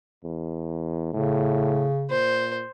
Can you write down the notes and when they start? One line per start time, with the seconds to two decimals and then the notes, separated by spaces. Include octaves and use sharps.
0.24 E2
1.13 A2 C#3
2.10 A#2 C5